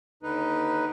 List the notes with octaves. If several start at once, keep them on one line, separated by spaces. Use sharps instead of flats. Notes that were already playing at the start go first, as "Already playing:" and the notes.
D#2 D3 D#4 B4